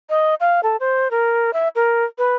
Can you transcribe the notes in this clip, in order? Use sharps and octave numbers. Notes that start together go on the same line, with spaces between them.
D#5
F5
A4
C5
A#4
E5
A#4
B4